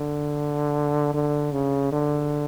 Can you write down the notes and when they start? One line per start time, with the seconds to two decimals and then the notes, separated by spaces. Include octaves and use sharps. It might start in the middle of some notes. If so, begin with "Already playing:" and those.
Already playing: D3
1.14 D3
1.52 C#3
1.92 D3